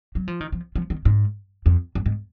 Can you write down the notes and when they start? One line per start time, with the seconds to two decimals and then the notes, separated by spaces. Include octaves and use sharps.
0.15 F#3
0.28 F3
0.41 D#3
0.52 F3
0.76 F3
0.90 D#3
1.05 G#2
1.66 F2
1.95 F#2
2.06 G#2